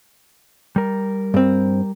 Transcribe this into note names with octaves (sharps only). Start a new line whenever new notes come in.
G3 A#4
G2 C4